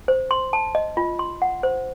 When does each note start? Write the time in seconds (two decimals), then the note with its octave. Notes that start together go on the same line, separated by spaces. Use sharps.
0.08 C5
0.31 C6
0.53 A5
0.75 D#5
0.97 F4
1.19 C6
1.42 F#5
1.63 C5